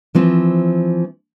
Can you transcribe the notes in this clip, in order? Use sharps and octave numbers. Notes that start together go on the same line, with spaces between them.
E3 F3 C4